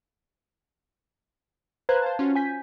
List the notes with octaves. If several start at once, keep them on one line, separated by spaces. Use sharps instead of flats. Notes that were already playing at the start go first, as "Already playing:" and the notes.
B4 C5 F5 A#5 F#6 G#6
C5 F5 A5
C#4 F4 F#4
G#5 G6 B6